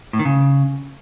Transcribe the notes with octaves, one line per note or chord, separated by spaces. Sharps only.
A2
D#3
C#3